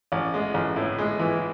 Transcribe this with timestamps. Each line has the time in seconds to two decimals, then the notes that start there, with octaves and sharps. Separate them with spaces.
0.12 A1
0.34 G#3
0.54 A1
0.76 A2
0.98 G#3
1.19 E3